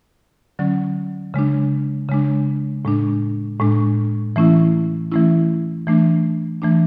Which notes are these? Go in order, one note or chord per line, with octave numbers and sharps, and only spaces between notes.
D3 F#3 C#4
C#3 G#3 D4
C#3 G#3 D4
A2 G#3 D4
A2 G#3 D4
E3 A3 C#4 E4
E3 A3 C#4 E4
E3 A3 D4
E3 A3 D4